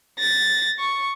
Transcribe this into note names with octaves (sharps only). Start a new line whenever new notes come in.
A6 A#6
C#6